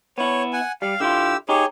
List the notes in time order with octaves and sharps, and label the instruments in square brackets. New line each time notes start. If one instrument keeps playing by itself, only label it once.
[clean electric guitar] B3 E4 [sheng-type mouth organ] C#5
[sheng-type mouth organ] F#5 G#5
[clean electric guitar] G3 [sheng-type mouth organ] F5
[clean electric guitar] D3 E4 F4 [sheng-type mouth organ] G4 E6
[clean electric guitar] D#4 G4 [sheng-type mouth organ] G#4 C#5